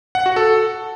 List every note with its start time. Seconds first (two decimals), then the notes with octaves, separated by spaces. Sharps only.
0.15 F#5
0.26 F#4
0.36 A4